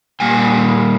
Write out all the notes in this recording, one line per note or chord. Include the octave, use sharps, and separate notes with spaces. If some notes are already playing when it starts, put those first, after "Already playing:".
A#2 G3 A#3 G#5